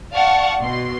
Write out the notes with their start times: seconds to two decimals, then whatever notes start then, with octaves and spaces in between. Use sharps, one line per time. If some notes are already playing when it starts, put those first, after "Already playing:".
0.13 D5 F5 F#5 A5 C#6
0.60 B2 C6